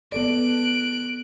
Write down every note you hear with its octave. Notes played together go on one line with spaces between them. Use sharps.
B3 A4 D5 F#6 D7